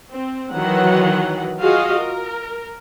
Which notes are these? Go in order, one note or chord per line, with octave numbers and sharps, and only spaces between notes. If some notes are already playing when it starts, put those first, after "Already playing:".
C4
D#3 E3 F#3 F#5
F4 F#4 G#4 D#5 F5
A#4